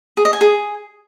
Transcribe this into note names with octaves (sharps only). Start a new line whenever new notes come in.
G#4
D#5
G#5
G#4